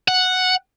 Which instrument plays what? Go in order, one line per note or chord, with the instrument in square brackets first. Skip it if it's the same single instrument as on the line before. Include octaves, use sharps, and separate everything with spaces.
[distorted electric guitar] F#5